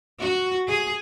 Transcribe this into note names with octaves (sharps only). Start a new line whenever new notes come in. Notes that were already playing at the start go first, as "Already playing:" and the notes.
F#4
G#4